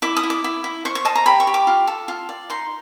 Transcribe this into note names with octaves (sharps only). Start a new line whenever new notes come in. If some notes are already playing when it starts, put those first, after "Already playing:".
E4 D6
D#6
E4
D6
E4
E4
C5 C#6
C#6
D#5 A5
A#5
G4 B5
C#6
G4
D6
F4
A4
F4
D5
D#4 C6